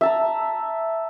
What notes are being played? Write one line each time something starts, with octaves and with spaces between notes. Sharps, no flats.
E5 A5 A#5